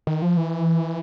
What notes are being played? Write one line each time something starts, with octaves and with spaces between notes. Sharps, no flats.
D#3
F3
E3